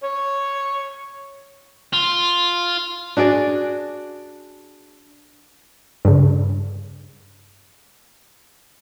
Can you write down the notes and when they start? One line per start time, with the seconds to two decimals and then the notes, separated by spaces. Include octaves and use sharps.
0.03 C#5
1.93 F4
3.17 D4 F#4 G#4 D5
6.05 G2 C#3